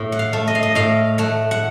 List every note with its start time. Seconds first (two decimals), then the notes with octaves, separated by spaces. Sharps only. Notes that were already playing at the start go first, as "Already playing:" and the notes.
Already playing: A2
0.12 F#5
0.19 F5
0.33 A3
0.47 D#5
0.55 F5
0.63 D#5
0.75 A2 F5
1.18 A3 F#5
1.51 F#5